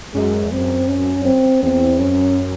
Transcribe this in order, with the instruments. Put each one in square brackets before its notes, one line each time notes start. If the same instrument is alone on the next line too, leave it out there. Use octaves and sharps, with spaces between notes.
[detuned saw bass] F#2 [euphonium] G#3
[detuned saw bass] E2
[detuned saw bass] F#2 [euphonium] C4
[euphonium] C#4
C4
[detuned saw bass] E2 [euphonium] C4
[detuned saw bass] F#2 [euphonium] C#4